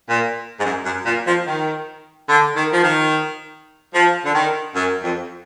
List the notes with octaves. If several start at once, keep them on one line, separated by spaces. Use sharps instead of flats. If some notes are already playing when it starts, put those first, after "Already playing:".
A#2
G#2
F#2
F#2
A#2
F3
D#3
D3
D#3
F3
D#3
F3
D3
D#3
F#2
F2